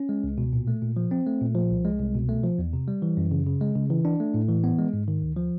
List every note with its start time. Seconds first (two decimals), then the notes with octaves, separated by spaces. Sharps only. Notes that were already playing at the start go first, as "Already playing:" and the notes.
Already playing: C#4
0.09 G#3
0.24 C#2
0.38 B2
0.53 A#2
0.68 A3
0.82 A#2
0.97 F3
1.11 C4
1.27 A3
1.41 A#2
1.55 F3
1.70 C2
1.85 G#3
2.00 C2
2.15 B2
2.29 A3
2.43 F3
2.58 E2
2.73 C3
2.88 G3
3.02 E3
3.17 F#2
3.31 C#3
3.47 C#3
3.61 G#3
3.76 C#3
3.90 E3
4.05 D4
4.20 A3
4.34 A2
4.48 E3
4.64 B3
4.78 G#3
4.93 G#2
5.08 D#3
5.22 D2
5.36 F3